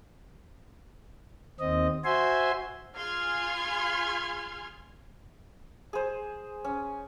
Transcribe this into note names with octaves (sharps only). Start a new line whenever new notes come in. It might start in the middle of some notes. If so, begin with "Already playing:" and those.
D#2 C4 D#5
F#4 C5 E5 G#5 C6
F4 G#4 C6 F6 G#6
G#4 C5
C#4